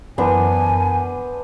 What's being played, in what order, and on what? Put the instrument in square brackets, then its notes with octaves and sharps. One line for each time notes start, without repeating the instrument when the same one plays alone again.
[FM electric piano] F#2 E3 A#4 [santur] B3 D4 C5 [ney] G#5